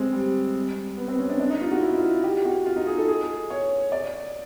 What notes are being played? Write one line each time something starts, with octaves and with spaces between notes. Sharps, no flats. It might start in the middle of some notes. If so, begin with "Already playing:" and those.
Already playing: G#3 C4
G3
B3
C4
C#4
D4
D4
D#4
F4
F#4
E4
F4
E4
G4
F#4
F4
D#4
G#4
A4
G#4
C#5
D5